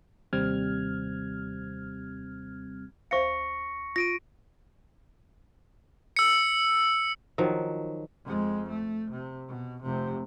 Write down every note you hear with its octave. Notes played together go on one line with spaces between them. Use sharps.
D#2 C3 G3 C4 F6 G#6
D2 C5 F5 C#6 A#6 C#7
F4 A#6 D7 D#7
E6 C#7
D#3 F3 F#3
F2 G#3
A3
C3
B2
F1 C3